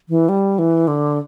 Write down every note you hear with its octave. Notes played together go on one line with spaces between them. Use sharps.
E3
G3
E3
D3